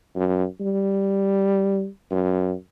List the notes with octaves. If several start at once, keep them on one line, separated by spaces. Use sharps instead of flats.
F#2
G3
F#2